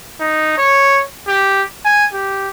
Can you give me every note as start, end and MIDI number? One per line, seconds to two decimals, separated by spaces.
0.20 0.53 63
0.57 1.01 73
1.28 1.63 67
1.85 2.06 80
2.13 2.49 67